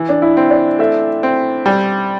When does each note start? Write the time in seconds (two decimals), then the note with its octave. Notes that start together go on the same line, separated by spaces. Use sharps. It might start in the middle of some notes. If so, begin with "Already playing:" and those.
Already playing: E3
0.09 D4
0.22 E4
0.37 C4
0.50 D5
0.79 A3 E5
1.23 C4
1.66 G3 G5